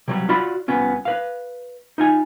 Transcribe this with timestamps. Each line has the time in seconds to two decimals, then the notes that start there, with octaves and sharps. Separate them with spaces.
0.08 C3 F#3 G3
0.29 F4 F#4 D5 B5
0.68 C2 B3 C#4 F4
1.05 B4 F5
1.98 D#4 F4 G#5